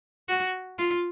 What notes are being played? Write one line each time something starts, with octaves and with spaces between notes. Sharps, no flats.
F#4
F4